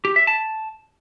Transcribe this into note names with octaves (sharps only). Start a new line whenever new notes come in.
G4
E5
A5